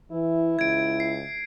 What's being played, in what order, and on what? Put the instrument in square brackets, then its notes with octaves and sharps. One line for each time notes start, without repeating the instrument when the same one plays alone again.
[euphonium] E3 [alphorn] E4
[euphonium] C#2 [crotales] G#6 D7
[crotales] C7